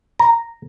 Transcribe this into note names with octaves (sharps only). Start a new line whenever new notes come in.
A#5